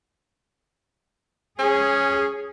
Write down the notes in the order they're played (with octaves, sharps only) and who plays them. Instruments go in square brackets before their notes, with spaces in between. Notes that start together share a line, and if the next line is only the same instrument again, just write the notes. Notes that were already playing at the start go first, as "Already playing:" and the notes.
[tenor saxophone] C#4 [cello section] G#4